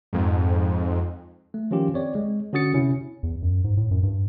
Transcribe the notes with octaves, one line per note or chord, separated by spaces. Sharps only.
F2 G#2
A3
D#3 F3 C#4 F4 G4
C4 C#5 D5
G#3
D3 C#4 F#4 D#6 A6 C#7
C3 C#4 E4
E2
F#2
G#2
A2
F#2
G2